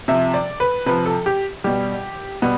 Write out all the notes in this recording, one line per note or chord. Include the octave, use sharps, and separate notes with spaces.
C3 F3 E5
D5
B4
C3 F3 B4
A4
G4
B2 G3 G4
B2 G3 B3